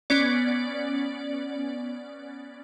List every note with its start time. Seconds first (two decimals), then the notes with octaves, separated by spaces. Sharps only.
0.10 B3 C#4 D5